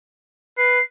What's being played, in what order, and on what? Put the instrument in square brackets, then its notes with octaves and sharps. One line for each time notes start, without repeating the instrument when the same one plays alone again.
[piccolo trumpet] B4 [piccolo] C7